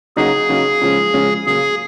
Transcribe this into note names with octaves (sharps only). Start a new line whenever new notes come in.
C#3 F#3 A#3 D#4 F#4 G#4
C#3 F#3 A#3 D#4 F#4
C#3 F3 G#3 C#4
C#3 F3 G#3 C#4
C#3 F#3 A#3 G#4